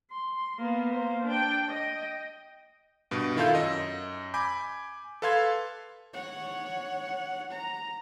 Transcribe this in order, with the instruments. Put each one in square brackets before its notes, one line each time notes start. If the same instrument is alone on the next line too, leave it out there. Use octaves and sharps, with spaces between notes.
[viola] C6
A#3 B3
A#3 C5
D4 G5
D#5 G5
[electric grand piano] G2 B2
D#3 E4 F4 A4 F5 G6
F#2 D#5 E6
G#5 B5 D6 G6
A4 B4 F5 C6 G#6
[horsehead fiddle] C#5 F#5
A#5